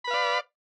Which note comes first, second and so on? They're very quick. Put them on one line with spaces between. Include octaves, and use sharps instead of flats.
B5 B4 F5 D5